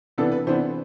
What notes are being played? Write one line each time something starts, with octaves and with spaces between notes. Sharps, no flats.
C3 E3 B3 D4 A4
B4
C3 E3 B3 D4 C5